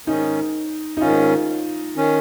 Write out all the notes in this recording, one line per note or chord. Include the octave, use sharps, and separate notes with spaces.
G#2 D#3 C#4 D#4
D#4
G#2 D#3 C#4 F4
D#3 C#4